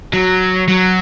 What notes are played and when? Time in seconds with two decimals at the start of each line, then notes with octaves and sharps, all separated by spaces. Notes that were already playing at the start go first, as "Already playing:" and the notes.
0.13 F#3
0.68 F#3